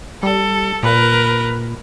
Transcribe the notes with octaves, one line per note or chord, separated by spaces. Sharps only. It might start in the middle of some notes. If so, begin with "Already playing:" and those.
G3 A4
A#2 A#4 B4